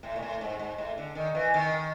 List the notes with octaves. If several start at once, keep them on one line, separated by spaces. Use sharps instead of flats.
A2
A#2
A2
G#2
G#2
A2
D3
D#3
E3
D#3